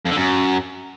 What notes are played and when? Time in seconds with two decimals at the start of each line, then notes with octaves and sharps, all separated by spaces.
0.06 F2
0.11 D3
0.17 F#2